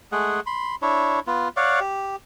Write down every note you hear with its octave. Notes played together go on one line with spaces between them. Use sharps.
G#3 A3 G#4 F#5
B5 C6
D4 E4 C#5
B3 F4
C#5 D5 F5 F#5
G4